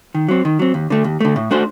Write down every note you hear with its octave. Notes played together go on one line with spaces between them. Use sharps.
D#3
F#3 C4
D#3
F#3 C4
D#2
D3 A3
D#2
D3 A3
A2
A3 D4 F#4 C5